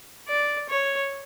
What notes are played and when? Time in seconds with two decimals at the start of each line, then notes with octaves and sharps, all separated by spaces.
0.28 D5
0.69 C#5